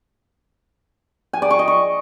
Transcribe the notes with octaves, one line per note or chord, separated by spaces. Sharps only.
G#5
D5
C#6
D#5
C#6